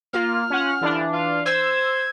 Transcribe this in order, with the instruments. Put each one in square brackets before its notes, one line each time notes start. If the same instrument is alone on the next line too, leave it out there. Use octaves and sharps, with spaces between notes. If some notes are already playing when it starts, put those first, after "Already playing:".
[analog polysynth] A#3 F4 [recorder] F6
[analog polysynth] C#4 F4 F#5
[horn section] G2 D3 F3 [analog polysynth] E3 D4
[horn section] F4 F5
[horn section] C5 [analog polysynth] E6 [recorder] G#6